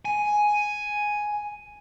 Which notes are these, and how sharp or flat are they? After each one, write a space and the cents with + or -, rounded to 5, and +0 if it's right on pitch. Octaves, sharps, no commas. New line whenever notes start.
G#5 +5